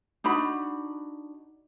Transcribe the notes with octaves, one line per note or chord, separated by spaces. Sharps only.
D4 D#4 F#4 B5